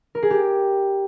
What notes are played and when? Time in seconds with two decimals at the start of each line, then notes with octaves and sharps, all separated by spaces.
0.15 A#4
0.23 G#4
0.30 G4